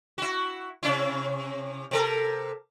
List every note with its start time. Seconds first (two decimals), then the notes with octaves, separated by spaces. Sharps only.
0.18 E4 F#4
0.83 C3 C#4 E4
1.91 C3 A4 A#4